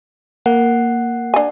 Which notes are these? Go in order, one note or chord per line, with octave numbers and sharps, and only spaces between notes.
A#3 F#5
D4 G#5